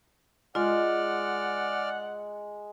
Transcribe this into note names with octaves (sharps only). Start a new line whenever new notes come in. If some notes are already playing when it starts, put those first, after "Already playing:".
G#3 F4 D5 F#5 F6